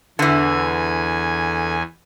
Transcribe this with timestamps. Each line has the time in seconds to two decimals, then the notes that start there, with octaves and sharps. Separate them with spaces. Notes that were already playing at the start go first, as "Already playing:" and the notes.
0.19 E2 D3 E3 G#5